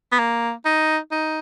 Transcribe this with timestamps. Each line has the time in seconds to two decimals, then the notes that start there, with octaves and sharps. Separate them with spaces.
0.12 B3
0.19 A#3
0.65 D#4
1.11 D#4